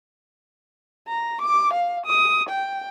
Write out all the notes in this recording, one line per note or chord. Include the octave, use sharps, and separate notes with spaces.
A#5
D6
F5
D#6
G5